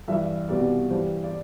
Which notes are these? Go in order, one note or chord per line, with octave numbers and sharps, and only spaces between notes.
G2 E3 G3 E5
C2 B2 G3 D5
G2 E3 G3 C5
D5